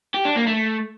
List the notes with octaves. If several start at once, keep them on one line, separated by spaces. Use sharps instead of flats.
G4
D4
A#3
A3